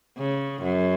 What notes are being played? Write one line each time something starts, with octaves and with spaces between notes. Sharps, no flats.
C#3
F#2